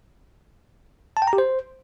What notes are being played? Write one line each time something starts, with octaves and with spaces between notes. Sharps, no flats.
A5
G5
A#5
G4
C5